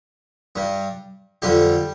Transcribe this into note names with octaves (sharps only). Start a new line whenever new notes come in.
G2 G3
F2 D3 G3 G4